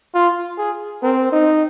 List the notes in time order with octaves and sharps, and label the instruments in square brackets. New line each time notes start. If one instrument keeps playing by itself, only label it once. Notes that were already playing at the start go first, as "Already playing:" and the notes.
[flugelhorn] F4
G#4
[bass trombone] C4 [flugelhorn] A#4
[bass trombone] D#4